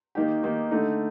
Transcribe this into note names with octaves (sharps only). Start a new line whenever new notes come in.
D#3 A#3 D#4 G4
D#3 A#3 D#4 G4
D3 A3 D#4